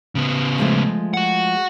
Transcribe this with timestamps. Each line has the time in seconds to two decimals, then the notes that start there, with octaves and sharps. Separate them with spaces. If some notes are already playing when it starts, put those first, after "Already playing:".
0.15 C#3 B3
0.58 F3 G#3 A3
1.14 F#4 F#5